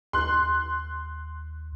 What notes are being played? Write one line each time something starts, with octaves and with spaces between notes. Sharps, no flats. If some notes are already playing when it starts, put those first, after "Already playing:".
D#2 C6 F#6